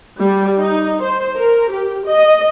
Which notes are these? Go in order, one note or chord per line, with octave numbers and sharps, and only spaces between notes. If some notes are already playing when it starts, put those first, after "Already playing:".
G3
D#4
C5
A#4
G4
D#5